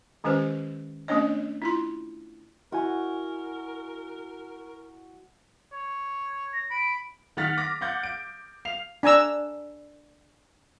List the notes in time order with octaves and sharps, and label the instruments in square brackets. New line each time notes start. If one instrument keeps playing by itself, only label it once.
[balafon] D#3 G#3 C#4 G4 B4 C5
A3 B3 C#4 D4 C#5 D#5
E4 F4 C6
[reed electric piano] E4 G#5 [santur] F#4 [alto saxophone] A#4
[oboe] C#5
[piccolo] A#6
[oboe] B5 [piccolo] D7
[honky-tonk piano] D#3 F#5 F6 A6 B6
D6 A#6
F5 F#5 D6 G6 A6
D7
F5 C7 F7
[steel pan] D4 G#5 A#5 E6